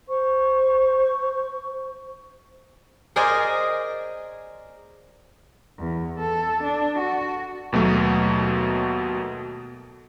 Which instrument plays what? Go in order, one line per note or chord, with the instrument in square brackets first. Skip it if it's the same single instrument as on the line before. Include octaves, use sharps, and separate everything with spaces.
[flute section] C5 C#6
[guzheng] G#4 A#4 C5 D5 D#5 G#5
[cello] E2
A4
D4
F#4
[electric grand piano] D#2 B2 F#3 A3